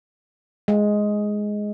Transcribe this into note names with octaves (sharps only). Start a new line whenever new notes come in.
G#3